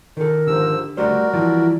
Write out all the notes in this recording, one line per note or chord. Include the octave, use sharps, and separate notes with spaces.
D#3 A4 A#4
G#2 D3 F3 G4 E6
G3 A3 F#4 A#4 C5 D5
E3 F3 G3 E4 D5